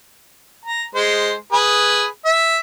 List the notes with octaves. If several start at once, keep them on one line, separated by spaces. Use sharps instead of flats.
A#5
G#3 C5
G#4 B4
E5